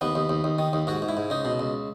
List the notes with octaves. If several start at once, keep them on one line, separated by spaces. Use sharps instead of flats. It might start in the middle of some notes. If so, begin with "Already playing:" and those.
D#2 B3
D#2
D#2
D#2
D#3
D#2
G#2 F#4
G#2
E4
G#2
C#2 D#4
B2
C#2